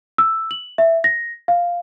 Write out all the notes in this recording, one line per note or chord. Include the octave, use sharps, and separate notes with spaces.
E6
F#7
E5
A#6
F5